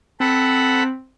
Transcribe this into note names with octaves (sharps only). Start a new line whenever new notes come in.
C4 A4 F#5 B5